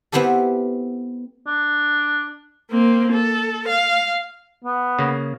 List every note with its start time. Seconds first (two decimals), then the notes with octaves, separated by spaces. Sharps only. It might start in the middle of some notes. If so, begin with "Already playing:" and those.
0.12 B3 C4 E4 G4 A4
1.47 D4
2.70 A#3 C4
3.12 A4
3.68 F5
4.64 B3
4.99 C#3 A#3